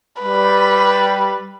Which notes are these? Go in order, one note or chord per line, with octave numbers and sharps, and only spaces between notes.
G3 B4